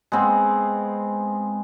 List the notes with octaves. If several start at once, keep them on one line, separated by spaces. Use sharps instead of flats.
G#3 B3 C4